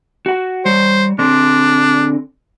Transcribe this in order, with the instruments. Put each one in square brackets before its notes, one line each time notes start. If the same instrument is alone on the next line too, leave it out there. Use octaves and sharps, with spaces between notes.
[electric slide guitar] F#4 F#5
[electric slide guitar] G3 C#5 [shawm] C5
[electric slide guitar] D3 C4 [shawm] D4